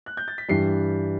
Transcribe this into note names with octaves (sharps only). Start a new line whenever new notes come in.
F#6
G6
A6
B6
G2 E3 G3 C7